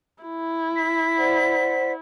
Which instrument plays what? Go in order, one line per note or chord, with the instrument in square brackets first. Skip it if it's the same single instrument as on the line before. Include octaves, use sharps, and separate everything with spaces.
[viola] E4
[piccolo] B6
[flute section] C5 D5 F#5